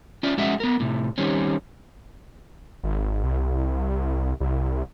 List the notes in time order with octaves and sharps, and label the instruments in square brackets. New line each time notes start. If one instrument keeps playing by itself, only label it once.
[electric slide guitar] C#4 F4 D5
G#3 C#4 F#4 G#4 E5
B3 A#4
A2 C3
D#3 G3 C4 C#4
[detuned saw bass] G#1
C2
C2